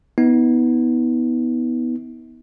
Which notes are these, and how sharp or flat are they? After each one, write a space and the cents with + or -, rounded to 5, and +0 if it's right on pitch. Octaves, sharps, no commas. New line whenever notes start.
B3 +0 D#4 +45